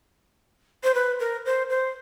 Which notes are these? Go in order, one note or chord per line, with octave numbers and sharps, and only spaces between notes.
C5
B4
A#4
C5
C5